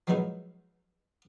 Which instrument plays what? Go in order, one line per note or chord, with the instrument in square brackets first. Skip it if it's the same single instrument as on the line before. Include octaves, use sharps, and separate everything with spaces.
[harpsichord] F3 F#3 G#3 B3 D#4 E4